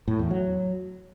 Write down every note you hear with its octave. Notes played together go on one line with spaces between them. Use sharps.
A2
E2
F#3